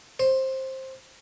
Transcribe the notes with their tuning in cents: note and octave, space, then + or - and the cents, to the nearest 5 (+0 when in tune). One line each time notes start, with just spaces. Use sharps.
C5 +15